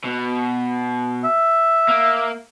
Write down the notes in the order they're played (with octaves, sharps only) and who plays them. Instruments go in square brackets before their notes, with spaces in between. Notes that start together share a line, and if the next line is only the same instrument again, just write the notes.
[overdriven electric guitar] B2
[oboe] E5
[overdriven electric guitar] A#3